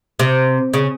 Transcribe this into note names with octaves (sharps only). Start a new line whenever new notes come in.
C3
C#3